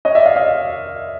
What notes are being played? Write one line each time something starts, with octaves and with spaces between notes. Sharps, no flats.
C#5 D#5
D5 E5
D#5 F5
D#5 F5